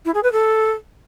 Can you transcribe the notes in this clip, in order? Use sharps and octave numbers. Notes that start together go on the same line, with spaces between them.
E4
G#4
B4
A4